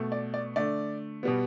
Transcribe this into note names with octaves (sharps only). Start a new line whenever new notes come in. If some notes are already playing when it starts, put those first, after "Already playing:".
Already playing: B2 A3
D5
D5
D3 A3 D5
B2 G3 B3